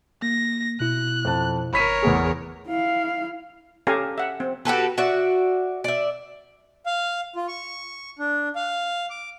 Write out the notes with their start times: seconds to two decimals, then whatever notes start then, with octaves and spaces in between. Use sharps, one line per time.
0.22 A#3 A#6
0.80 B2 E4 F#6
1.25 F2 A5
1.73 G#1 A#4 C#5 B5 B6 D#7
2.02 E2 B3 G#4
2.67 E4 F5
3.87 C#4 G4 A4 F5 G#5 A#5
4.18 E5 F#5
4.40 C4
4.65 F#4 G4 A4 B4
4.98 F#4 D5 E5
5.84 D5 E5
6.86 F5
7.36 F4
7.48 C#6
8.19 D4
8.55 F5
9.10 D6